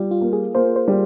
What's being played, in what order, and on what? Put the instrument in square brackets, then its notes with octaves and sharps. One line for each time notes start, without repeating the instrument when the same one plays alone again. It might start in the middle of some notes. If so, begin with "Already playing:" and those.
Already playing: [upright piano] G3 [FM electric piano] F4
[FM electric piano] F4
[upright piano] A#3
[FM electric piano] G#4
[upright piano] A#3 [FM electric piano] C5
[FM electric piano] C5
[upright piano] G3